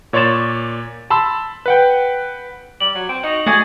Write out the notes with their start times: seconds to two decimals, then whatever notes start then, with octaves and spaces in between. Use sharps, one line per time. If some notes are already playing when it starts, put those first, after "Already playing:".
0.13 A#2 C#5 D5 C6 A6 E7
1.10 A5 B5 C6 E6
1.66 B4 F#5 G5
2.80 G3 F#7
2.95 F#3
3.09 C4
3.23 D#4 F#4
3.46 A3 F#4 G#4 D5 G#5